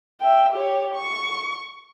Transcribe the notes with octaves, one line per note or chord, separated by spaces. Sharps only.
E5 G5
G4 C#5
C#6